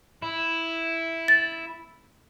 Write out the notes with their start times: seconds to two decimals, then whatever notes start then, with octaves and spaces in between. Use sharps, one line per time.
0.22 E4
1.28 A6